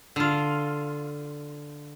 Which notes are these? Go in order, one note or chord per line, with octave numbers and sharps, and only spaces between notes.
D3 F4